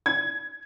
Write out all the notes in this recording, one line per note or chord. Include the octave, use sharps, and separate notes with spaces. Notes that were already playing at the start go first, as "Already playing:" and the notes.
G#6